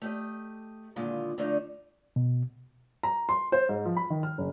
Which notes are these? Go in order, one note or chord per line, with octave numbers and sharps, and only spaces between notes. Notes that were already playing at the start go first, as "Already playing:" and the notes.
A3 G4 D#5
A#2 D3 D#3 G#3 F4
D3 F3 A3 D4 D#4
B2
A#5
C6
C5
G#2
F3
B5
D#3
F6
F#1